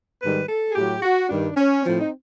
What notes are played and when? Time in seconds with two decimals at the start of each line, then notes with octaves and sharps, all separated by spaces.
0.22 G#2 D#3 G3 B4
0.49 A4
0.69 G#4
0.76 A2 F#3 G4
1.03 F#4
1.29 G2 D#3 G3 D4
1.56 C#4
1.82 A2 F3 C4
1.99 D#4